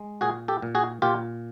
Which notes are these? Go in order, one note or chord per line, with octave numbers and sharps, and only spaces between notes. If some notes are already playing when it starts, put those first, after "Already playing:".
Already playing: G#3
A#2 F#4 G#4
G4 A4
A#2
F#4 G#4
A#2 F4 G4